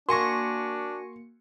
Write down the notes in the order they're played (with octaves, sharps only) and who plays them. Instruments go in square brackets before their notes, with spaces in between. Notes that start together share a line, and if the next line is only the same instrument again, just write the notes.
[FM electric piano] A#3 C#7 [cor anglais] D4 [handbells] F#4 G#5 A#6 [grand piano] C6 C#6